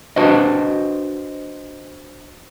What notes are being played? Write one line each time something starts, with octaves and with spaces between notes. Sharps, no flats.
D4 F#4 B4 C5 D#5